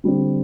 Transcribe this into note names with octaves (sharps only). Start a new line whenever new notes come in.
D3 G3 C4